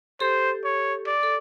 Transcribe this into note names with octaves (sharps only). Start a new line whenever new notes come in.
G4 A4 C5
C#5
D5
A4